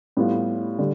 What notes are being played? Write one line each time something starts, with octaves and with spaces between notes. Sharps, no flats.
A2 G3 B3 F4
D3 G3